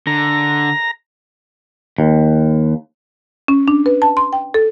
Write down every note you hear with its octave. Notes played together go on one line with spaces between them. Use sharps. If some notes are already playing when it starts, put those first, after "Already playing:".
D3 A#5
D#2
C#4
D4
B4
A5
C6
G5
A4